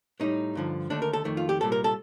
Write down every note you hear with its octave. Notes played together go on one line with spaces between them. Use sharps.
A2 G3 D#4
G2 D3 F3
D#2 D3 A3 D4
A#4
A4
F2 D#3 A3
F4
G4
C2 A#2 G3 A4
A#4
A4